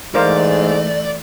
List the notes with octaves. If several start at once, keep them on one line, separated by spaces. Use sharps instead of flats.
G#2 E3 A3 A#4 C5 D5 F5